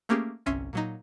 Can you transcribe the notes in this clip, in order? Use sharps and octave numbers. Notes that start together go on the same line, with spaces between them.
A3 A#3 C#4 G4 G#4
G1 C2 C#4 E5 C6
A#2 F#3 D#4